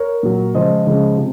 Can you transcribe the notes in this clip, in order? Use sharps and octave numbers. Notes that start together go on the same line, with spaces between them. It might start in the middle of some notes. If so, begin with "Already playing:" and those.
Already playing: A#4 C#5
A#2 F#3
C#3 F3 G#3 C5 D#5
C#3 F3 G#3
C3